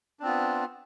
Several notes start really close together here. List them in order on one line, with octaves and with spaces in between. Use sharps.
D4 C4 F4 B3